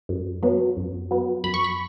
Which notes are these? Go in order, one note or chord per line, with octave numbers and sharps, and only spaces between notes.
F#2
F#3 B3
F#2
F#3 B3
F#2 B5
C#6
B5